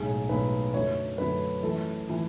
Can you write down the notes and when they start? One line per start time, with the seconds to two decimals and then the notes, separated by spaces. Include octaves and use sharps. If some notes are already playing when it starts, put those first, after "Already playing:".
Already playing: B1 A2 G#3 G#4
0.29 B1 A2 G#3 B4
0.74 F#2 D3 F#3 A3 C#5
1.18 F#2 D3 F#3 A3 B4
1.63 F#2 E3 A3 A4
2.10 E3 A3